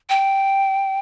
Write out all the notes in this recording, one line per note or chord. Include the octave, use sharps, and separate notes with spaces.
G5